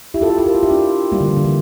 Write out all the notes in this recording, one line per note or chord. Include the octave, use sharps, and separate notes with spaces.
E4 G4
F4 A4
E4 G4
F4 A4
G4 A#4
F4 A4
E4 G4
D4 F4
G3 A#3
D3
E3
D3
E3